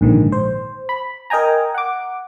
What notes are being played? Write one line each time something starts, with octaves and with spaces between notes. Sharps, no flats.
A#1 G#2 D3 D#3
C5
B5
A#4 D#5 G5 G#5 A#5
F#5 D6